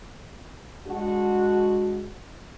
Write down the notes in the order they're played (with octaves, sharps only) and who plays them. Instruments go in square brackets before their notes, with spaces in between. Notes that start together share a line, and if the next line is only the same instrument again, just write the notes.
[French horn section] G#3 D4 F#4